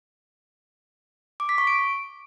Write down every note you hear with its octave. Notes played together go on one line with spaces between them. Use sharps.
D6
B6
C#6
D7